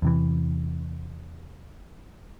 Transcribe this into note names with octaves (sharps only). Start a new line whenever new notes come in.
E2 C3 E3